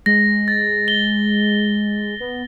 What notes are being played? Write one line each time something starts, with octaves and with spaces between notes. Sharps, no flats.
G#3 A#6
A6
G7
B3